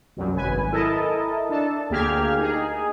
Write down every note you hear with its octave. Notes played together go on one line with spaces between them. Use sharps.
C2 F#2 F#3
G#1 B4 G#5
E4 A4 A#4 D#5 A5
D4 A4 A5
D2 A#3 G4 G#4 F6 G#6
D#4 G#4